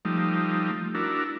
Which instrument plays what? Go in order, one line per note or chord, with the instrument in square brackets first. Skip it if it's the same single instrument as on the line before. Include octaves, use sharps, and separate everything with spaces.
[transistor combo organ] F3 G3 A3 D#4
D4 E4 F#4 A#4